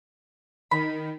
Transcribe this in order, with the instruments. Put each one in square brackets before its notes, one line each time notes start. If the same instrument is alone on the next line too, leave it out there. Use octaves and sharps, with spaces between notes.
[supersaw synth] D#3 [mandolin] B5